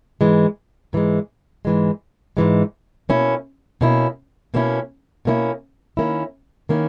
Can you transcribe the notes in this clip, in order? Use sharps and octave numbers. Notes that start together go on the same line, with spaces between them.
G#2 E3 G#3
G#2 E3 G#3
G#2 E3 G#3
G#2 E3 G#3
B2 A#3 C#4 E4
B2 A#3 C#4 E4
B2 A#3 C#4 E4
B2 A#3 C#4 E4
D#3 A#3 C#4 E4
D#3 A#3 C#4 E4